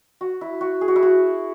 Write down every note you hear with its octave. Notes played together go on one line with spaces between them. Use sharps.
F#4
E4
F#4
G#4
F#4
E4
F#4